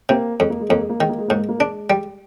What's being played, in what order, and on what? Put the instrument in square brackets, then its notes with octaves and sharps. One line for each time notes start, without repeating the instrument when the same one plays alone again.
[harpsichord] C3 [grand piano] A#3
[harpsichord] F2 [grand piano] G#3
[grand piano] A#3
G#3
[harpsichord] F2 [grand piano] A#3
[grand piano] G#3
A#3
[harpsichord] D#3 [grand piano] G#3
[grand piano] A#3
G#3
[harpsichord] G#2 [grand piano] A#3
[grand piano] G#3
A#3
[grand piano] G#3 [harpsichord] D4
[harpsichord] G3